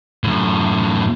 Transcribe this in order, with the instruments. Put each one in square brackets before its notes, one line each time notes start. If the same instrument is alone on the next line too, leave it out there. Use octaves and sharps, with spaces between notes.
[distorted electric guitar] F#2 A2